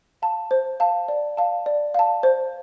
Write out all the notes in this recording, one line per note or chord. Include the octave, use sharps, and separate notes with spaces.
F5 A5
C5
F5 A5
D5
F5 A5
D5
F5 A5
C5